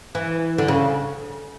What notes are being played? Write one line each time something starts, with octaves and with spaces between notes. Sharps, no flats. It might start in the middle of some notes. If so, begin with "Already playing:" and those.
E3
D3
C#3